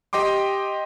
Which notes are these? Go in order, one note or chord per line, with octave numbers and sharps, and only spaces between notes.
G4 D#5 G5 C6 D6